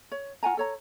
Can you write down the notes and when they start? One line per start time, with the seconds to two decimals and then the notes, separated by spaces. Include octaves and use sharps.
0.12 C#5
0.43 F4 F#5 G#5 A#5
0.57 A4 C#5 A#5